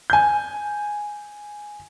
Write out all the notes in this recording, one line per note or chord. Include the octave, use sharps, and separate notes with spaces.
G#5 G6